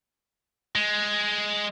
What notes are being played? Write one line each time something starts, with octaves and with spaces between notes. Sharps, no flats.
G#3